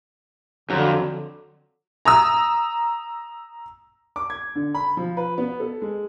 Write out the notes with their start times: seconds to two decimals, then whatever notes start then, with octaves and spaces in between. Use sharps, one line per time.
0.70 F2 D3 F#3
2.05 A#5 D#6 E6
4.16 D6
4.30 G#6
4.55 D3
4.74 B5
4.97 F3
5.17 B4
5.38 B3
5.60 A4
5.82 G#3